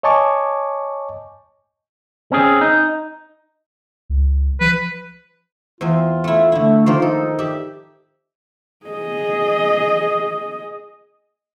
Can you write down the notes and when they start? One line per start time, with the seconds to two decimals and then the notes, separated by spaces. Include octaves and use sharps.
0.03 C#5 D#5 G#5 A5 C#6 D6
2.32 C4 C#4 G#4
2.61 D#4
4.10 C#2
4.61 F3 B4
5.81 E2 C4 F4 G#5
6.24 A3 E4
6.52 D3 A3 E4
6.86 D#3 F3 A#3 F4
7.02 D#4 A4
7.39 G4 D5 E5
8.86 G#4 D#5